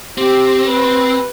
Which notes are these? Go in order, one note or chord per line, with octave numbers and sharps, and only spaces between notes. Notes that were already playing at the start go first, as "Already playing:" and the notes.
C4 G4
B4